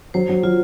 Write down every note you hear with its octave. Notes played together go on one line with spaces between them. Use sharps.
F#3 C5
F#3
F#3 F4